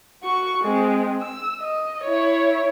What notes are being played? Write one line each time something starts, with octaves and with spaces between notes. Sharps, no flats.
F#4 C#6
G#3 C4
E6
D#5
E4 C#5